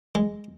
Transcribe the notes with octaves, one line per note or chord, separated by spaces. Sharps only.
G#3